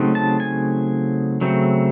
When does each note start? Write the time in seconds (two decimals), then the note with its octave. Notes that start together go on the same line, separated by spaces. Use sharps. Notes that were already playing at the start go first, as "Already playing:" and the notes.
Already playing: C#3 F#3 A3 C4 D#4
0.15 A5
0.40 G#5
1.41 C#3 F#3 A3 C4